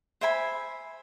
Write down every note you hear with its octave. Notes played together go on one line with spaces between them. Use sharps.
C5 E5 G#5 B5